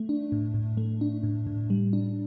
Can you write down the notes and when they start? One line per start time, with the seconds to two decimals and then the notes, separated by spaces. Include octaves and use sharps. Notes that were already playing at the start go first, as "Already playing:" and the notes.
Already playing: A3
0.09 D4
0.32 A2
0.54 A2
0.77 A3
1.01 D4
1.23 A2
1.47 A2
1.70 G3
1.93 D4